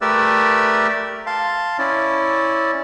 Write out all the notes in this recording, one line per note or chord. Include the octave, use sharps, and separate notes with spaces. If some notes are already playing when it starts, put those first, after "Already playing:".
A3 G4 A#4 B4 D5 E6
F5 A5 C6
C#4 E4 D5